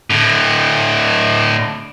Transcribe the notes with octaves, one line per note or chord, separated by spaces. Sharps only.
A2 D3